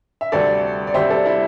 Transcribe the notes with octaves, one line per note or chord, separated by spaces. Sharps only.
E5
D2 C3 G3 C4 A4 D5
D5
D2 C3 G3 C4 C5 E5
A4 D5
E4